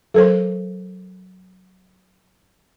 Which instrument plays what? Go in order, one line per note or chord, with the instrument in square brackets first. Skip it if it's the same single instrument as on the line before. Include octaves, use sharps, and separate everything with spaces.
[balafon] F#3 A#4 C5 [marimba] A4